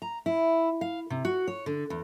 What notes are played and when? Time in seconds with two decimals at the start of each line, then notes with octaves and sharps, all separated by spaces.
0.02 A#5
0.26 E4
0.81 F5
1.10 C3
1.25 F#4
1.48 C#5
1.66 D3
1.90 E2